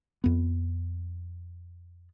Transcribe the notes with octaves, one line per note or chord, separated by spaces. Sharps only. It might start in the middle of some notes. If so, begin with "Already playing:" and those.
F2 B3